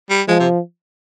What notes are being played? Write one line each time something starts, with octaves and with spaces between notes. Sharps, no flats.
G3
F3 G#3
C3